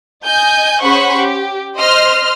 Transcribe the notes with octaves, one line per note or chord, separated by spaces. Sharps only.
D#5 G#5 G6
C#4 G#4 C5 F#5 B5 C#6
G4
C5 D#5 C6 F6